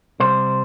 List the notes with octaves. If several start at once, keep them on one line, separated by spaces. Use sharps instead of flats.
C2 C3 G3 C5